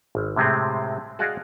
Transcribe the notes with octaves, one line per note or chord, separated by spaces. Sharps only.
G#1
A2 C3 G#3 A3 C4
F#4 G#4 D5 D#5 F5 F#5